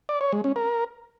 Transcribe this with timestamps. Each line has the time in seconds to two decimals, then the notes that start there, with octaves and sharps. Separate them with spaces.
0.09 D5
0.21 C#5
0.32 G#3
0.44 C#4
0.56 A#4